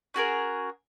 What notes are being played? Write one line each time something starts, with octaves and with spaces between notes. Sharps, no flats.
C#4 F#4 G#4 A#4